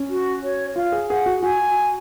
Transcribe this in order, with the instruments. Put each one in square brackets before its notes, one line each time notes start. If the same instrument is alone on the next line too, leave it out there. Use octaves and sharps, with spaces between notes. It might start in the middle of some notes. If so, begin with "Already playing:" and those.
Already playing: [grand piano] C#4
[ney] F#4
C#5
[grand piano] F4 [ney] F5
[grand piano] G#4
[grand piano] G#4 [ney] F#5
[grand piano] F#4
[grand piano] F#4 [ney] G#5